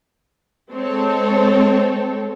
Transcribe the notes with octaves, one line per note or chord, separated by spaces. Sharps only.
G#3 C4 A4 C#5